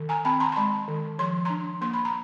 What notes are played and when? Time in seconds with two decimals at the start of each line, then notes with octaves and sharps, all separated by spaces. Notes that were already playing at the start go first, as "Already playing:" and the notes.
Already playing: D#3
0.09 G#5 A#5
0.25 C4 A5 B5
0.40 A#5 C6
0.52 C6
0.56 G#3 A5 B5
0.88 D#3
1.19 F3 C6
1.45 D4 A#5 C6
1.81 A#3 C6
1.93 B5
2.05 A#5